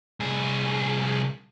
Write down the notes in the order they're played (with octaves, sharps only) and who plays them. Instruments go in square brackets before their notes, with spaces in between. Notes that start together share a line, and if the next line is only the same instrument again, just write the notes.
[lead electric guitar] C2 G#4